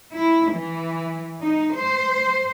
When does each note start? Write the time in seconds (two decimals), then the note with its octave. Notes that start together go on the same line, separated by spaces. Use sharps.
0.13 E4
0.53 E3
1.41 D#4
1.73 C5